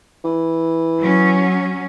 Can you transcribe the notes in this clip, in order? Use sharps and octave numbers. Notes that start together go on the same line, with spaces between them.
E3
F#3 C#4